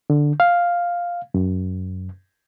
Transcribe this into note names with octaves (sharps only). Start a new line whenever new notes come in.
D3
F5
F#2